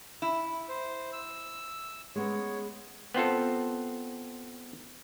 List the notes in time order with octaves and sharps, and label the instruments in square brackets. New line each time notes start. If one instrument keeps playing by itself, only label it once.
[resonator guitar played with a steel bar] E4
[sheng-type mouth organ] C5
E6
[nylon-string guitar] G#3 B3 C#4 [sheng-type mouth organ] C#5
[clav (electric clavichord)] B3 C4 F4 A4